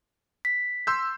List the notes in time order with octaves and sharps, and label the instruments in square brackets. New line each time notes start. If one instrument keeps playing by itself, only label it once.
[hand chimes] B6
[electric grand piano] C6 E6 G6